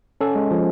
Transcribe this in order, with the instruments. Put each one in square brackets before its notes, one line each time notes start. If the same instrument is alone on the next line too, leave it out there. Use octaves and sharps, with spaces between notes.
[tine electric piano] C#4 A4
G#3
F3